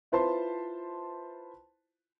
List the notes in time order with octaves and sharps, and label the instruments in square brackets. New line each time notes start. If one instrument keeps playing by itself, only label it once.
[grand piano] E4 F4 B4 C5 A5 C6